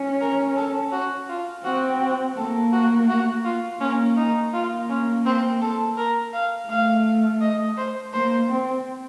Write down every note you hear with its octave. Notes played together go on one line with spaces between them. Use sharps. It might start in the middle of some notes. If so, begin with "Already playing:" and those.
Already playing: C#4
A#4
A4
F#4
F4
C4 F#4
F#4
A#3 A4
F#4
F#4
F4
A#3 C#4
D#4
A#3 F4
C#4
C4
A4
A#4
F5
A3 F5
D#5
C5
A#3 C5
C4